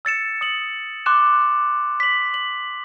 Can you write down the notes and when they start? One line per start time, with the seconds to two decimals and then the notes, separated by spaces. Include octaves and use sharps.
0.05 E6 A6 C#7 E7
0.41 D#6 C#7 F#7
1.06 C6 D6 F#6 E7
2.00 B6 F#7
2.34 F#7